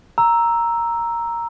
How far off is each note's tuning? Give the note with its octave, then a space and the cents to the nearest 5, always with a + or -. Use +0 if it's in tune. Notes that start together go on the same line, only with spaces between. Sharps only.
A#5 +0 E6 +0